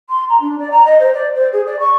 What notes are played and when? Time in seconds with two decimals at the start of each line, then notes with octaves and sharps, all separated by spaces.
0.09 C6
0.29 A#5
0.40 D4
0.58 D5
0.71 A#5
0.85 D#5
0.99 C5
1.13 D5
1.34 C5
1.52 G#4
1.66 D5
1.79 C#6